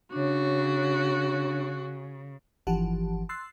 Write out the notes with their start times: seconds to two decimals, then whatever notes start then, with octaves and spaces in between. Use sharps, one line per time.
0.12 C#3 D4 F#4 C#5
2.67 G1 E3 F3 G4 F#5 A5
3.29 C6 E6 F#6 A6 C7